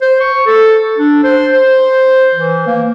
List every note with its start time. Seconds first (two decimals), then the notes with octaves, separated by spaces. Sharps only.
0.01 C5
0.21 C#6
0.46 A4
0.98 D4
1.24 C5
1.52 C5
2.35 E3
2.67 A#3